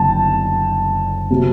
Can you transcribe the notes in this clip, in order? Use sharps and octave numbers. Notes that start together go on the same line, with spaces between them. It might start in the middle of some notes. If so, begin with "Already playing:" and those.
Already playing: F#1 F#2 D3 G5 A5
C3 F#3 A#3